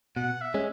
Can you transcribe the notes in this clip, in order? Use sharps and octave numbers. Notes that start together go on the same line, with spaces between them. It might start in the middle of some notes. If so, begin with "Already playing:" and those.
B2 F#5
E5
G#3 C#4